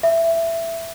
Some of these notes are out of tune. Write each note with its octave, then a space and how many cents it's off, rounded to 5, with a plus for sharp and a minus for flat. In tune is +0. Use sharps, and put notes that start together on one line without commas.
E5 +10